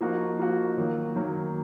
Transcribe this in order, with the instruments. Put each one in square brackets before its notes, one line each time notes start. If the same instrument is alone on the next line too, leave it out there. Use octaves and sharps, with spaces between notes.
[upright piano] F3 A#3 D#4 F#4
F3 A#3 D#4 F#4
D#3 F#3 A#3
D#3 F#3 A#3